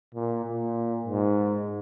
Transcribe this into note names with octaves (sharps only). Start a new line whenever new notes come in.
A#2
A#2
G#2